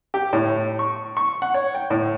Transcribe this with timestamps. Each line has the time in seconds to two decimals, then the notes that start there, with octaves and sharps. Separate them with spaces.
0.14 G4
0.33 A2
0.79 C#6
1.17 C#6
1.42 F#5
1.54 C#5
1.75 G5
1.90 A2